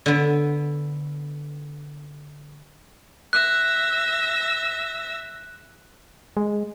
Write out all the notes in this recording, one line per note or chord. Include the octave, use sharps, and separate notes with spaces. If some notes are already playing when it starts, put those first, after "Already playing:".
D3 B3
E5 E6 F#6 A#6
G#3